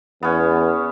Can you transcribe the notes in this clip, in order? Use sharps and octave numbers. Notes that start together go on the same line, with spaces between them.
E2 B3 C#4